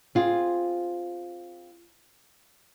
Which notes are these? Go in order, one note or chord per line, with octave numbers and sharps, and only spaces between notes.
C4 F4 G#4